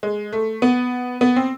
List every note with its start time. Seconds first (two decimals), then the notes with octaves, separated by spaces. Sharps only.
0.03 G#3
0.33 A3
0.62 B3
1.21 B3
1.36 C4